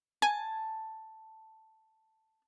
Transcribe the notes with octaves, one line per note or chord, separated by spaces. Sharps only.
G#5 A5